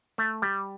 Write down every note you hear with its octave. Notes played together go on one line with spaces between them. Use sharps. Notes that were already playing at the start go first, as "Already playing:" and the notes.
A3
G3